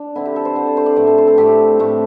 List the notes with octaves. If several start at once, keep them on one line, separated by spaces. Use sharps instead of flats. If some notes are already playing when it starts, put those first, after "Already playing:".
Already playing: D4
D3 C4 E4
G4
A4
C5
D3 C4 C5
D5
C5
D5
A2 A3 C4 C5
A4
C5
A4
A2 A3 C4 G4
A2 A3 C4